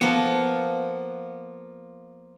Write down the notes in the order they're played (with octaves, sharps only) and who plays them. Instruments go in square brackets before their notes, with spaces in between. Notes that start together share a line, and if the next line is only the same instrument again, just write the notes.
[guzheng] F3 A#3 [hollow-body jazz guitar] B3